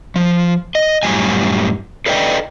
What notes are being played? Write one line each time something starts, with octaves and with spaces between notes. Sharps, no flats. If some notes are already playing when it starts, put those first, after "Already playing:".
F3
D#5
F#2 A2 F3 G3 G#5
A4 B4 D5 D#5 G5